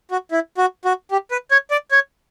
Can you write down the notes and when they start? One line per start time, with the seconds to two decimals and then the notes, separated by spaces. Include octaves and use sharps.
0.11 F#4
0.31 E4
0.58 F#4
0.85 F#4
1.11 G4
1.31 B4
1.51 C#5
1.71 D5
1.91 C#5